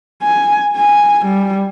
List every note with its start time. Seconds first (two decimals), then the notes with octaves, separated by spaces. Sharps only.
0.22 G#5
0.77 G#5
1.26 G3